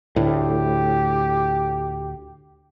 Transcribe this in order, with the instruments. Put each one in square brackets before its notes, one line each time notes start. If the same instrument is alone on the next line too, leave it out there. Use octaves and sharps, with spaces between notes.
[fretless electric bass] D2 A2 [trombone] G4